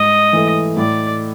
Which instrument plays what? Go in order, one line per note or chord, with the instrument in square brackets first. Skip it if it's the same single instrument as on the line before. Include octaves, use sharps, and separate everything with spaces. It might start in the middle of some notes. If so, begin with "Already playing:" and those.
Already playing: [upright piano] G#2 [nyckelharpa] D#5
[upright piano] E3 A3
[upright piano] A2 [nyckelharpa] D5